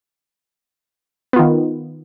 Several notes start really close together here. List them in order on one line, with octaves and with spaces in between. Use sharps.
B3 F4 D#3